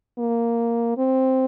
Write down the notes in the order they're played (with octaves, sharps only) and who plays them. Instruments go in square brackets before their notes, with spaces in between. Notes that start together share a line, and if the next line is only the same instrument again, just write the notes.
[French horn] A#3
C4